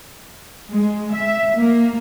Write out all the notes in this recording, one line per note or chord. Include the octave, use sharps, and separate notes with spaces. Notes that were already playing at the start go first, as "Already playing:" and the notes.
G#3
E5
A#3